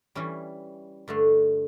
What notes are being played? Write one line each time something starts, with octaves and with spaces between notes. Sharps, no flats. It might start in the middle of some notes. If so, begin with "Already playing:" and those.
E3 G3 C#4
G2 D3 A3